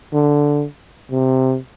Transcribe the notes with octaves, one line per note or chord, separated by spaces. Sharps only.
D3
C3